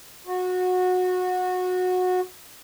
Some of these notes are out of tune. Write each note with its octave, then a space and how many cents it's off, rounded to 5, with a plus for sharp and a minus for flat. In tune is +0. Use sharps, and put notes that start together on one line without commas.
F#4 -20